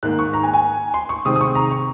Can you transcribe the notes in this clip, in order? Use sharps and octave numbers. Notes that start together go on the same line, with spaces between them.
G#2 D#3 A#3 F#6
C#6
A#5
G#5
G#5
C6
C#6
C3 D#3 G#3 C4 D#6
D#6
C#6
A#5
C#6